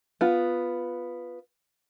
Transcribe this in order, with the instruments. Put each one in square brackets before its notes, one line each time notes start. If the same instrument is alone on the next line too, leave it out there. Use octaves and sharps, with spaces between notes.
[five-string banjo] B3 F4